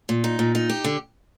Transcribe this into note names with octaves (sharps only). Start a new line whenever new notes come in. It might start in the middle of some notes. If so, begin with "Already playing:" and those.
A#2
D#4
A#2
D#4
G4
D3